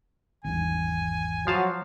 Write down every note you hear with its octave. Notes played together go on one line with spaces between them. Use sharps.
G#1 E2 G#5
F3 F#3 F5 A5